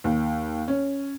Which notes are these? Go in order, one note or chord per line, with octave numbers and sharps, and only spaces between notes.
D#2
C#4